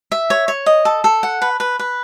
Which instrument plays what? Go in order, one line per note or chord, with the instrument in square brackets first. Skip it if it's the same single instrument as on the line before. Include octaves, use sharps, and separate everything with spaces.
[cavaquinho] E5
C#5
C#5
D#5
A4
A4
F#5
B4
B4
B4